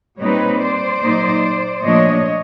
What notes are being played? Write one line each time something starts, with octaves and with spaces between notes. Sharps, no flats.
A#2 G3 C4 D#4 B4 C#5
C5 D5
A#2 F#3 A#3 D#4
A#2 F3 A3 D4 C#5 D#5